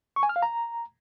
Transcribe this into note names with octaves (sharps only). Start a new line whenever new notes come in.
C#6
G#5
F6
F5
A#5